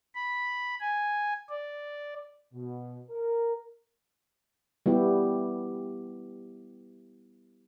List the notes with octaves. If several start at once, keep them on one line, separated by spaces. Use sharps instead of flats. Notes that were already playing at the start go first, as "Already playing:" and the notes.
B5
G#5
D5
B2
A#4
G3 B3 E4 G4